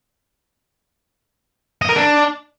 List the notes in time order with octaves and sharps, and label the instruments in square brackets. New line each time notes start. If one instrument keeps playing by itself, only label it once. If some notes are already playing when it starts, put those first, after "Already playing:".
[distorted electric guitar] D#5
A#4
D4